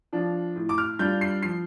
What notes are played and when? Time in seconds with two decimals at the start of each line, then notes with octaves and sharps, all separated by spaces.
0.13 F3 D4 F4
0.56 A2
0.69 D6
0.78 F6
0.99 G3 D4 F4 G6
1.21 C7
1.43 F3 C7